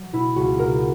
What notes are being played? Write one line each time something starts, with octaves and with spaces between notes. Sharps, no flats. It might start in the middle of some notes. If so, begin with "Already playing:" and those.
Already playing: F#3
B2 E4
C#2 F#4
B2 A#4